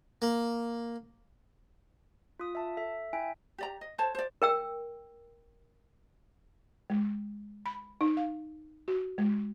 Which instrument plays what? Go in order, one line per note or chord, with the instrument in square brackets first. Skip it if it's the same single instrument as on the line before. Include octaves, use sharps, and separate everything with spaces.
[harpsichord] A#3
[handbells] F4 D#6
E5 A5
A4 E5
E4 E5 G5 G#5 D7
[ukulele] G4 D5 A#5
D#5
A4 C5 C#5 A5
C5 D5
[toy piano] A#4 G5 E6
[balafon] G#3
B5
D#4
F5
F#4
G#3